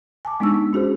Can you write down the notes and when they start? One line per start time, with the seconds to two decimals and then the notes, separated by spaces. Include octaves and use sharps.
0.25 G#5 A5 D6
0.40 G#3 B3 D4 D#4 C#6 E6
0.54 B3
0.73 C#4 F#4 G#4 C5